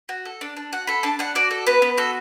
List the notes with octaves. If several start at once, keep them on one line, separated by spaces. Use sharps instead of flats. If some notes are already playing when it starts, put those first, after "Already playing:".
F#4
A4
D4
D4
F#4 F#5
A4 B5
D4 A5
D4 F#5
F#4 D5
A4
B3 B4
B3
F#4 A4